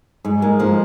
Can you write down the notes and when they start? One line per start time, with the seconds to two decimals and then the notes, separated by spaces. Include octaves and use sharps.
0.24 G#2 G#3 G#4
0.42 G#3 A#3 A#4
0.59 F3 A#3 A#4